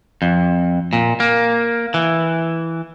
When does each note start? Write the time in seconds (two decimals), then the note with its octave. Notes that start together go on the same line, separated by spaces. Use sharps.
0.22 F2
0.93 A#2
1.20 A#3
1.94 E3